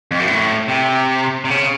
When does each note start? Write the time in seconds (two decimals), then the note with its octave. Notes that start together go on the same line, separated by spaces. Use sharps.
0.11 F2
0.20 F#2
0.27 A2
0.68 C3
1.45 C3
1.50 C#3